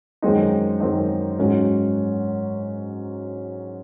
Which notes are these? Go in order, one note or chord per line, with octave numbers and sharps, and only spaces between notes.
F#2 D#3 G#3 C4 D#4
F#2 D#3 G#3 C4 D#4
G#2 F#3 C#4 F#4 C#5